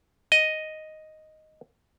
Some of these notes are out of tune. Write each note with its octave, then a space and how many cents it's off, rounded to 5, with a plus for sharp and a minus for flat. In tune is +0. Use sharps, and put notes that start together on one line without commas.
D#5 +0